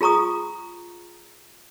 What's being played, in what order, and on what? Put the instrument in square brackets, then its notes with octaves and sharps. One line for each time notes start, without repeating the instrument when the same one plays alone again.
[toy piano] F4 G#4 A#5 C#6 D#6